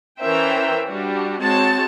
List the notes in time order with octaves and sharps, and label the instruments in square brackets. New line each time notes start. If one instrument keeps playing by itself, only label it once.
[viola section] E3 C#4 A#4 C5 E5 G5
G3 D4 F#4
G#3 C4 F#4 C#5 A5